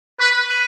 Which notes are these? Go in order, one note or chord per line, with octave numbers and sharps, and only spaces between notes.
B4 C#6
F#6 B6 D#7 F#7